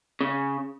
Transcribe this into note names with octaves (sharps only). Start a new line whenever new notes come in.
C#3